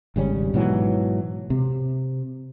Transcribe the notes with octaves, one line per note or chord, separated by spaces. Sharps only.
G#1 C#3 G3 C#4
G#2 B2 E3 F#3
C3